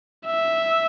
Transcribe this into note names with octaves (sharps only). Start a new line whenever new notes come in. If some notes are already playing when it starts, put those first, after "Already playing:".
E5